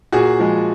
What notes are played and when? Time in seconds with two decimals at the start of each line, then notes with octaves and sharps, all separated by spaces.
0.12 A#2 F#4 G#4
0.39 F3 G#3